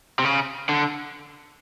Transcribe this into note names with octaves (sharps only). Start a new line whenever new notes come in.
C3
C#3
D3